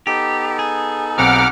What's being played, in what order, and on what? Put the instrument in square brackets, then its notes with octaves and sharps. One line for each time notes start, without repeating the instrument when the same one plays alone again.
[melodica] B3 D#4 A4 [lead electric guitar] G4
[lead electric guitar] G#4
[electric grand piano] B1 C4 A#5 [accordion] F#5 D6 F6